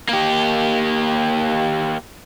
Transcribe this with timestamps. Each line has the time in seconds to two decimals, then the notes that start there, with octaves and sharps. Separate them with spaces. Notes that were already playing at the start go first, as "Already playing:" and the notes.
0.09 A#3 G4